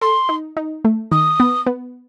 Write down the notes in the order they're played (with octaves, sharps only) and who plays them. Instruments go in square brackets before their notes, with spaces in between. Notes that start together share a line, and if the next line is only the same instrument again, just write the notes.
[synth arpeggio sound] A4 [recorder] C6
[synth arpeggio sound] D#4
D#4
A3
[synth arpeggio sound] D#3 [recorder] D#6
[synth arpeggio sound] B3
B3